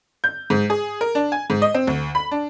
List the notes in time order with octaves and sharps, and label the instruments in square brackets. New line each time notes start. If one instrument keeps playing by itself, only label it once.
[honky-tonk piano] G6
G#2
G#4
A#4
D4
G#5
G#2
D#5
C4
D2
B5
D4